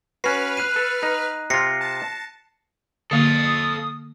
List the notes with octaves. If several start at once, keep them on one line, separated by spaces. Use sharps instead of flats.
C#4 F#4 B4 F6 C7
F#6 C7 D#7
A4
D#4
C3 F4 A#6 C7 C#7
A5
D3 A#3 A4 F5 D#6